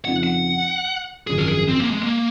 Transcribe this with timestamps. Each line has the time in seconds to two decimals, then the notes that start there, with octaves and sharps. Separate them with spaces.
0.05 F2 C#3 F3 C4 D#4 F#5
0.23 F#5
1.27 G#1 F#2 F3 G#4
1.38 A#4
1.47 G#4
1.68 C4
1.79 A#3
1.90 G#3
2.03 A#3